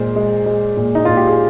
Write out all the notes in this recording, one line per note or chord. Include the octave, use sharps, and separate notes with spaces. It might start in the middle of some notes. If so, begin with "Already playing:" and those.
Already playing: A#2 G#3 C5
G#3
G#3
A#2
D#4
A#2 F4
G4
G#4